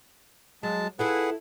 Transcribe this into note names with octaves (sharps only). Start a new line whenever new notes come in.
F#3 G#3 A5
E4 F4 G#4 A4 B4 F#5